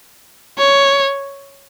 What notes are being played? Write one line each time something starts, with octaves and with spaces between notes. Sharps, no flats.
C#5